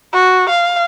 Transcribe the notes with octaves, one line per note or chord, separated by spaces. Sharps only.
F#4
F5